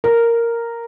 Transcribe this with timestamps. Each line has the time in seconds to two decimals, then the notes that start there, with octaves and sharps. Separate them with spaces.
0.04 A#4